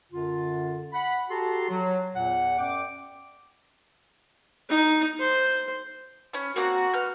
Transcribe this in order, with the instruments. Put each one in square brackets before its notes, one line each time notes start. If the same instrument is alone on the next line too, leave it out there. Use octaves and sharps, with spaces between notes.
[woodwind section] F#2 D3 F4
F#5 B5
F#4 G4 A4 A5 A#5 C6
F#3
E2 A#2 F#5
F#2 D5 G5 D6
[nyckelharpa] D#4
C5
[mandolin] C#4 B5
[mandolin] A#3 C4 A#5 [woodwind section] F#4
[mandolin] B4 F6 G6